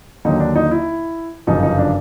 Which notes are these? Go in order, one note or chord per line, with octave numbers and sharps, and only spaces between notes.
D#2 D3 F#3 A#3 D#4
D4
D#4
E4
G1 F#2 C#3 F3 D#4
D#4
D4